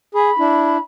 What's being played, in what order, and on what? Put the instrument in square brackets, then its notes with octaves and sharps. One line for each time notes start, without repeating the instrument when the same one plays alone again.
[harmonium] G#4 [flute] B5
[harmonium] D4 E4